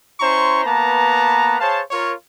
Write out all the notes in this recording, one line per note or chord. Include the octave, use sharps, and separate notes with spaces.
C#4 E4 C5 A#5 C6 C#6
A#3 B3 B4 A5 A#5
G#4 C5 C#5 F5 A5
F4 A#4 C#5